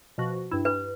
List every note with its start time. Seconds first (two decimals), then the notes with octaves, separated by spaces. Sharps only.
0.18 B2 F3 F#4
0.51 G2 E4
0.65 B4